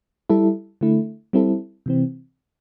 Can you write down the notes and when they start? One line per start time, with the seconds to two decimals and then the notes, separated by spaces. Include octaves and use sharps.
0.30 G3 E4 A4
0.81 D3 A3 E4
1.33 G3 C4 E4 A4
1.86 C3 E3 C4